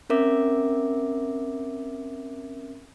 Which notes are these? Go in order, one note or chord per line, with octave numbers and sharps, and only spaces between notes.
C4 C#4 A#4 E5 D6